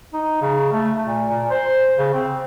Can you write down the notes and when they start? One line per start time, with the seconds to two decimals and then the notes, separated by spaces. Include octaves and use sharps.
0.13 D#4
0.42 C#3
0.73 A3
1.06 A#2
1.28 A#2
1.51 C5
1.98 C#3
2.14 C4